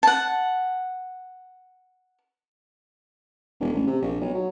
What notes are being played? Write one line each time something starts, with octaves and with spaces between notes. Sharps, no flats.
F#5 A5
E1
A1
C3
A#1
B1
F#3